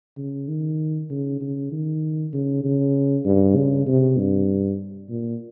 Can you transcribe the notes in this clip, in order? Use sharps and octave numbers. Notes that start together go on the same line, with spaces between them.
C#3
D#3
C#3
C#3
D#3
C#3
C#3
G2
C#3
C3
G2
A#2